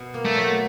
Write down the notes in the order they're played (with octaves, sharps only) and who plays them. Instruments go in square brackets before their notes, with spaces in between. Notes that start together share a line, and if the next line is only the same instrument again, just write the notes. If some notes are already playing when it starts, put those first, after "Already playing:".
Already playing: [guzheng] B2
A#3
[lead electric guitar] A3
[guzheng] F#3